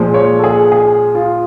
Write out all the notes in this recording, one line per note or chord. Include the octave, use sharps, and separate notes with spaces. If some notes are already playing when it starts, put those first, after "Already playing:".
Already playing: A#2 F3 G#3
C#5
A4
G#4
G#4
F4